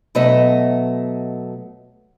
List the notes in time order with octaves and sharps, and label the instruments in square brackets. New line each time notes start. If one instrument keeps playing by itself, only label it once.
[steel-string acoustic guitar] B2 F#3 A3 D#5 E5